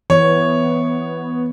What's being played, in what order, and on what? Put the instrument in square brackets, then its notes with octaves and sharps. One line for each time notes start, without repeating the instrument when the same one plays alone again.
[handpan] E3 [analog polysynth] B3 [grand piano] C#5